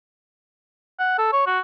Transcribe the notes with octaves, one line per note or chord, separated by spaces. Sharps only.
F#5
A4
C#5
F#4